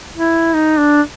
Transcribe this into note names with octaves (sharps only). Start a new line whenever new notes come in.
E4
D#4
D4